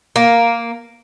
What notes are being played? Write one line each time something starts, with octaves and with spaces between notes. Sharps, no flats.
A#3